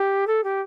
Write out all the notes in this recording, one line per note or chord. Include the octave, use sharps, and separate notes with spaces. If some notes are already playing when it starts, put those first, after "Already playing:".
Already playing: G4
A4
G4